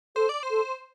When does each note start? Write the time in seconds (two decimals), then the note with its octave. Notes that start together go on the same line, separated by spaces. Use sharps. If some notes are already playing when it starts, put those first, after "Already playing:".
0.16 A4 C5
0.29 D5
0.43 C5
0.51 A4